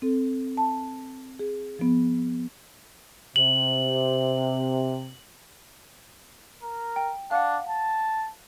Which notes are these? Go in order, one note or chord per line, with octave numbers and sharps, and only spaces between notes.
C4 A4
A5
G#4
F3 B3
C3 F#7
A#4
G5
D4 F5 F#5
A5